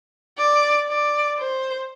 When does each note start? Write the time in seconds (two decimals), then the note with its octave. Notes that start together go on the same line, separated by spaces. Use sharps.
0.38 D5
0.88 D5
1.38 C5